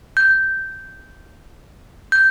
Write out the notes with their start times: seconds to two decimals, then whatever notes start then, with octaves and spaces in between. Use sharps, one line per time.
0.17 G6
2.12 G6